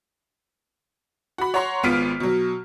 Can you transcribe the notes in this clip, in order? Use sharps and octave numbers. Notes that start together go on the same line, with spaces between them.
F#4 B5
C#5 F#5 A#5 C6
G#1 B3 F4 F6 B6 D7
B2 F#3